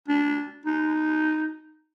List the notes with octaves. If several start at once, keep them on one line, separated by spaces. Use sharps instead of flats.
D4
D#4